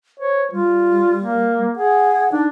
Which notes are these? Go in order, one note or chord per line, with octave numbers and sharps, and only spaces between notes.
C5 C#5
G3 F4
A#3
G#4 F#5
D4 D#4